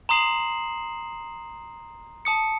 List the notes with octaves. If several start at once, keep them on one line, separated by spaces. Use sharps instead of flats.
A#5 C6 D#6 C7 E7 F#7
A5 D#6 C#7